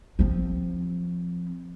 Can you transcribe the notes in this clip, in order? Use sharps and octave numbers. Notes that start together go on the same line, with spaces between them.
F3 C4